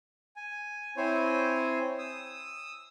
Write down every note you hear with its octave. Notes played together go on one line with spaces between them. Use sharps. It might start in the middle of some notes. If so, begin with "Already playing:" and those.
G#5
C4 E4 C5 C#5 G#5
D#6 E6